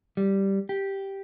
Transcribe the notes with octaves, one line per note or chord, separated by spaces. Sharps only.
G3
G4